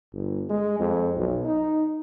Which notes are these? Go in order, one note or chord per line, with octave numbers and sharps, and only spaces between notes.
G1
G#3
F2
B1
D#4